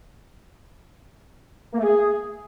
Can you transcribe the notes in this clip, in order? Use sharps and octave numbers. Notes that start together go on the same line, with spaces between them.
A#3
A3
G#4